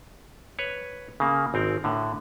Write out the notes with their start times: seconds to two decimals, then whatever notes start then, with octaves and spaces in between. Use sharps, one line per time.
0.59 B4 C#5
1.20 C#3 A#3
1.54 G#1 C4 A#4
1.84 A2 D3